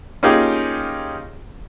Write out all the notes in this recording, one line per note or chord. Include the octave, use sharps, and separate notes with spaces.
A#3 C#4 D#4 F4 G4 G#4